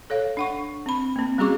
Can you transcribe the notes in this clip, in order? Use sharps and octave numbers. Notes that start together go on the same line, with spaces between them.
A4 C#5 F5
D4 F#5 C#6
C4 B5
A#3 C4
G3 C#4 F#4 G#4 C#6 D6